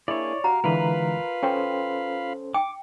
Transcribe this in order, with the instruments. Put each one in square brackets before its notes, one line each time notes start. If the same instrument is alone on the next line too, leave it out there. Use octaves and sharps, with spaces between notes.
[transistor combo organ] A#3 D4 G#4 [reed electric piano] E4 [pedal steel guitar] C#5 D5
[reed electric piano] F#4 [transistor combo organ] G4 F5 [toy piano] A#5
[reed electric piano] D3 E3 G#3 [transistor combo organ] F4 F5 B5 [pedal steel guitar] A#4 B4
[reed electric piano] C#4 A4 C5 [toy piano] G5
[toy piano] G5 [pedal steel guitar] D6